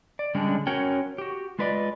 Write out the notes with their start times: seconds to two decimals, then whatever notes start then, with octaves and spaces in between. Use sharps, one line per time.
0.19 D5
0.35 D3 G3 G#3 C#4 D4
0.67 C#4 F#4 A#4 C#5 G5
1.18 F#4 G4
1.59 G#3 F4 B4 C5 D5 D#5